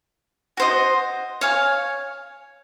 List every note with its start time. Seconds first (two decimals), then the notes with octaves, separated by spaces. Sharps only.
0.57 F#4 C5 D#5
1.41 C#5 F5 G#5